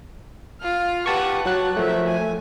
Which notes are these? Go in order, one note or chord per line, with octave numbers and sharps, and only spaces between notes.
F4 F6
G4 B4 F#5 A5 C#6
F#3 F#5 A5 F#6
F3 A3 A#4 E5
G#5